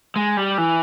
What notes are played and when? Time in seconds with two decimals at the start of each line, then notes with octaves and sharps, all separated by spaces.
0.16 G#3
0.37 G3
0.58 E3